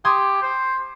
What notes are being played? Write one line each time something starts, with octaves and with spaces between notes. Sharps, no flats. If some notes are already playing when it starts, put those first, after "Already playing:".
G4 C6 D#6 G#6
C5